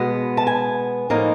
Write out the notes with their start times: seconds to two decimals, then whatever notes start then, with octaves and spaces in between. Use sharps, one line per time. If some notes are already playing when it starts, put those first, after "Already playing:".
Already playing: B2 G#3 B3
0.37 A5
0.47 G#5
1.10 A2 F3 A#3 D#4